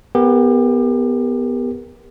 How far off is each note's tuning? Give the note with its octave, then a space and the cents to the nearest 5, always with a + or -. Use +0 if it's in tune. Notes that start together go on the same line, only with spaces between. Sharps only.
B3 +0 G4 +30 A#4 +0